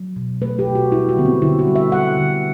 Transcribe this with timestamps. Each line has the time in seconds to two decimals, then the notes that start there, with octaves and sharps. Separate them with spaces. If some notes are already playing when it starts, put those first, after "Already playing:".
Already playing: F#3
0.16 B2
0.42 A3 B4
0.59 G4
0.67 B2
0.75 F#4
0.92 G3 E4
1.09 F#4
1.17 D3 B3
1.26 C4
1.42 D3 E4
1.59 F#4
1.67 G3
1.76 E5
1.92 G3 F#5
2.17 D3